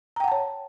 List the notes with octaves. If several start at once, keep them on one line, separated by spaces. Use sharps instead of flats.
C#5 F#5 G5 A5 A#5